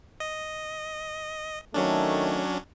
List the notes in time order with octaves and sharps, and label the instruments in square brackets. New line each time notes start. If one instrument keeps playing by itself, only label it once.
[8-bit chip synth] D#5
[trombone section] D#3 A3 [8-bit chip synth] F#3 C#4 D4